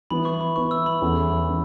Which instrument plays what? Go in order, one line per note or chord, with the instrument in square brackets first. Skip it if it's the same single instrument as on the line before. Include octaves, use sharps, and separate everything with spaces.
[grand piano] E3 B3 E4 B4 [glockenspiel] B5
[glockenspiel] C#6
B5
[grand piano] E3 B3 E4 B4 [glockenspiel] C#6
[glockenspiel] E6
B5
[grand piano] E2 E3 C#4 E4 A4
E3 C#4